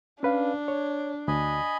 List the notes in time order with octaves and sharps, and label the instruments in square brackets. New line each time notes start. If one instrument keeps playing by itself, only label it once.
[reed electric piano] C#4 B4 F5 [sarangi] D4
[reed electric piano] C#5
[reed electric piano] D2 [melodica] D#5 G#5 B5